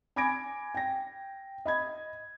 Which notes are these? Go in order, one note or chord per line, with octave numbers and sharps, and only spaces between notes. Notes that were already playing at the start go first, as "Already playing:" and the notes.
G#5 B5 D6 G#6 A#6 D7
G5 A#6
D#5 B5 G#6